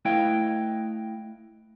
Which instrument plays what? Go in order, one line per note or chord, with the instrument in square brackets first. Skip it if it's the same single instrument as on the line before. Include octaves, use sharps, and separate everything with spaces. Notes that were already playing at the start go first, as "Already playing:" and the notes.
[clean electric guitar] A3 E4 B4 D#5 F5 G5